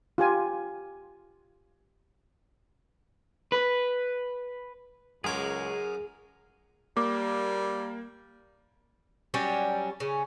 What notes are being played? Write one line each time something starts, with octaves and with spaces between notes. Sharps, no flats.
F4 G4 G#5
B4
C#2 F#2 G#3 G#4 A#4 C#5 D6
G3 A#3 D6
F#3 G3 C#4 D4
C#3 C#4